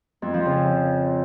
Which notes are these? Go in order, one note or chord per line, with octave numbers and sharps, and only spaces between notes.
F2
F3
C#3